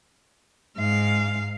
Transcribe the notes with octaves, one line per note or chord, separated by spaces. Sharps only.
G#2 F5